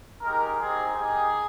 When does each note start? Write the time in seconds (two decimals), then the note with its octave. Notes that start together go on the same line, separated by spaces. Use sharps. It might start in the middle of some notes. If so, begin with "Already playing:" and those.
0.22 G#3 D#4 G4 A#4
0.58 C4 D#4 G4 G#4
0.93 A#3 D#4 G4 G#4